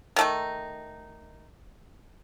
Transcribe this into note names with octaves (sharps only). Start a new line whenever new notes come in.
D#3 A3 D#4